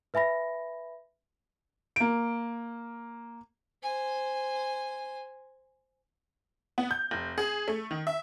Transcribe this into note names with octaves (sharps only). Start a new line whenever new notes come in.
B4 E5 G#5 B5 A#6
A#3 D7
C5 G#5
B3
G6
F1
G#4
A3
D#3
E5